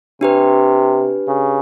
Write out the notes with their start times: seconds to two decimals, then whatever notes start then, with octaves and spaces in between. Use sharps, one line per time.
0.21 C3 D4 G4 B4
1.28 C#3